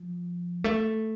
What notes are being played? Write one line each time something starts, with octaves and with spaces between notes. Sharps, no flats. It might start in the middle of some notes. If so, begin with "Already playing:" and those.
Already playing: F3
A3